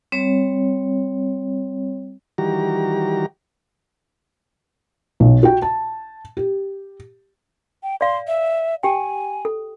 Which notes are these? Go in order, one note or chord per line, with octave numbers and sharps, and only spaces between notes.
G3 C4 C#5
D#3 E3 G3 F#4 G4 A#5
B1
F#4 G5
A5
G4
G5
D5 F5 C6
E5
G4 G5 G#5
A4